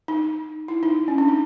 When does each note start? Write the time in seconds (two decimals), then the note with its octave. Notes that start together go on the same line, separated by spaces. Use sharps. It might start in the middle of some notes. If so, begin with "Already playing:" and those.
0.08 D#4
0.68 E4
0.83 D#4
1.08 C#4
1.18 D4
1.28 D#4